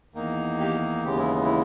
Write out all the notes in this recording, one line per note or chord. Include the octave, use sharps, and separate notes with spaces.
E2 D#3 A#3 D#4
G4
D#2 C#3 E3 G#3 B3 G4
E4
E4